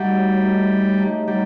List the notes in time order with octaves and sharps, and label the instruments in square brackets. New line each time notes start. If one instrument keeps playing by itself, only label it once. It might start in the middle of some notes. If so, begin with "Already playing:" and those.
Already playing: [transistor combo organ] G3 [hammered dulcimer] A3 D#4 F#4
[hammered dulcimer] A2
A3 D#4 G4
A2
A3 D#4 G4
[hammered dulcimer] F#3 [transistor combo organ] G3